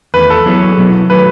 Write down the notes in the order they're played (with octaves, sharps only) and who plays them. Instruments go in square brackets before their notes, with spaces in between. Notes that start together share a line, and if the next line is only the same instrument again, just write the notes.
[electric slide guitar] E2 D#3 A3 [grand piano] B4
[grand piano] A4
[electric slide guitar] F#3 B3 E4 G#4 C#5
B2 F#3 B3 E4
[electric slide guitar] D#3 F#3 A3 [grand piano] B4